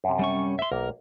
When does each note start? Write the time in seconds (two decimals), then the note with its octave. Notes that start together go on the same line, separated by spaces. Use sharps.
0.04 F#2 C3
0.19 G3 C#4 C#6
0.59 E5 C6
0.72 B1 A#3 A#4